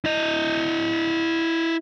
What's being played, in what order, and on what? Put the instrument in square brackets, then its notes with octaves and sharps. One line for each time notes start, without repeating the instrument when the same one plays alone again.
[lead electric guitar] E4 D#5